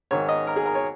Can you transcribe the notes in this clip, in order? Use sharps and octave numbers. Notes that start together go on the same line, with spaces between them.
G#2 D#3 C#5
D#5
A#4
G#4
A#4
C#5